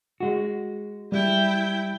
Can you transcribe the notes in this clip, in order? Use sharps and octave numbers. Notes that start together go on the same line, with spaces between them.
G#3 F#4
G3 E4 G5